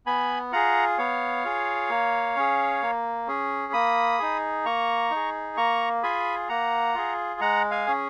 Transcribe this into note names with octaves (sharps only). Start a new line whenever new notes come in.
B3 G#5 B5
F4 G#4 F#5 A#5
B3 C#5 F5
F4 G#4
A#3
C#4 G#4
A#3
C#4 G#4
A#3 B5 D#6
D#4 G#4
A#3 A#5 C#6
D#4
G#4
A#3 A#5 C#6
F4 G#4 G#5 B5
A#3 F#5 A#5
F4 G#4
G#3 F#5 A#5
F5 G#5
C#4 G#4